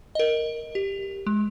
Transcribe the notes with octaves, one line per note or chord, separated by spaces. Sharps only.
A#4 D#5
G4
G#3